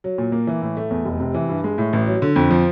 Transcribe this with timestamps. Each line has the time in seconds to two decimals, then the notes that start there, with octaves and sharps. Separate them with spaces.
0.04 F#3
0.18 A#2
0.32 A#3
0.47 E3
0.62 A2
0.77 A3
0.91 E2
1.05 F1
1.20 C3
1.34 E3
1.49 G2
1.64 G#3
1.78 A2
1.93 A1
2.07 F#3
2.22 D3
2.36 F2
2.50 F3